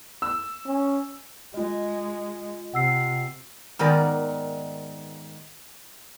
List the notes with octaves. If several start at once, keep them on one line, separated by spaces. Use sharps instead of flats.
E6
C#4
G#3 F4 D#5
C3 F#5 E6 C7
G#2 D#3 B3 A#4 D5